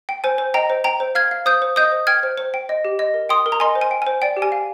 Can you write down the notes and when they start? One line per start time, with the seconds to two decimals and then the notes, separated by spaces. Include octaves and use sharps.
0.09 G5
0.24 C5 G#5
0.38 C5
0.54 D#5 G5 A#5
0.70 C5
0.84 G5 A#5
1.00 C5
1.15 F5 F6 G#6
1.31 F5
1.46 C5 D#6 G6
1.62 C5
1.76 D#5 D#6 G6
1.92 C5
2.07 G5 F6 G#6
2.23 C5
2.38 C5
2.54 G5
2.69 D#5
2.85 G4
2.99 D#5
3.14 A#4
3.29 G5 C6 D#6
3.46 A#4
3.52 A#5
3.60 D#5 G#5 C6
3.75 C5
3.81 G#5
3.91 G5
4.02 G#5
4.07 C5
4.22 D5 G5
4.37 G4
4.42 G#5
4.52 F5